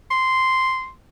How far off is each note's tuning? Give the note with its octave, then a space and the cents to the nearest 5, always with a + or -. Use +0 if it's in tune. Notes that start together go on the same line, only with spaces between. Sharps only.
C6 -5